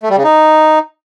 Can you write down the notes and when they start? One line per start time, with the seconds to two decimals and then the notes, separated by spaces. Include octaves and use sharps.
0.03 A3
0.10 G3
0.17 C#3
0.24 D#4